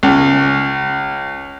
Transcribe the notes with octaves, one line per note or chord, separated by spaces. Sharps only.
C#2